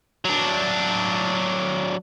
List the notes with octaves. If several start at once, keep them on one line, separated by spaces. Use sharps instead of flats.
F#3 D4